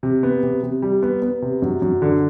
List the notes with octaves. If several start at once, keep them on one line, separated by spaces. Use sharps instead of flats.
C3
B3
C3
C3
G3
B3
B3
C3
F#2
F#2
D3